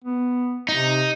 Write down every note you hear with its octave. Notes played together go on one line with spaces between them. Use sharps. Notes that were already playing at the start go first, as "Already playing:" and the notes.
B3
C3 D#4